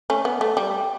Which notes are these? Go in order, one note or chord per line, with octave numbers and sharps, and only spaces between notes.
A3 C#4
B3
A3
G3